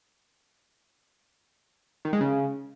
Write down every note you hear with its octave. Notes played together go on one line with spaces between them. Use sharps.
D#3
G#3
C#3